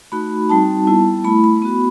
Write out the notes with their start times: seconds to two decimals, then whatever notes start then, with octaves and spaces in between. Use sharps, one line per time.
0.12 A3 D#4 F#4 B5
0.49 G3 C4 D#4 F#4 A5
0.87 G3 B3 E4
1.24 A3 E4 B5
1.44 B5
1.62 B3 F#4